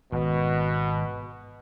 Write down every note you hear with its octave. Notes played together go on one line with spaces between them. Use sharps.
G#1 B2